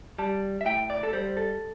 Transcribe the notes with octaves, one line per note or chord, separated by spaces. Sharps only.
G3 A5
E5
A2 G5
D5
A4
G3 C5
A4